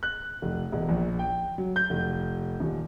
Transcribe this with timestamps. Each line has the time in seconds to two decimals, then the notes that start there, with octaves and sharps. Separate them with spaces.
0.03 F#6
0.42 F1
0.72 E1
0.89 A#1
1.19 G5
1.58 F#3
1.76 G6
1.90 F1
2.60 D#1